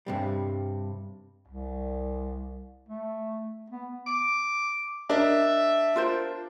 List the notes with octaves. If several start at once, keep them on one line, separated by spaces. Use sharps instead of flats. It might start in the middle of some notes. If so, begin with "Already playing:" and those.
G2 C3 G3
C2
A3
B3
D6
D4 A#4 D#5 E5
F4 A#4 C5